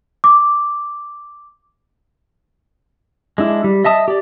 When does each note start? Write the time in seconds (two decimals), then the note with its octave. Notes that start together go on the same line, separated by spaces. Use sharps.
0.24 D6
3.38 G#3 D4 E4
3.64 G3
3.85 D#5 E5 A5 D#6
4.08 G4 D5